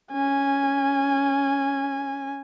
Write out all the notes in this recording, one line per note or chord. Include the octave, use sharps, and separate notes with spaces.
C#4 G#5